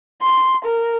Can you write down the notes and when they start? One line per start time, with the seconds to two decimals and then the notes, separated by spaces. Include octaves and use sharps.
0.22 C6
0.65 A#4